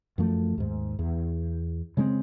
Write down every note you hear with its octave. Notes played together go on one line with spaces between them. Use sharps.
F#2 F3 A3
D#2 G#2
E2
C#3 G#3 A3 C4